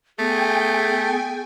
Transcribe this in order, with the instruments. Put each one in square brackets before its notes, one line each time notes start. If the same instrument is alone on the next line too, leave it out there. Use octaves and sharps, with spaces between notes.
[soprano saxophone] A3 [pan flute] B3 [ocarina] G#4 [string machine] G5 G#5